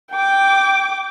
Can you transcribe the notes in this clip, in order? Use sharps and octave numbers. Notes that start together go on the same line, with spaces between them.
G5 D6